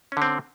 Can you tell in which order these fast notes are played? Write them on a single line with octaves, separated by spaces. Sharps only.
C#4 D3 C4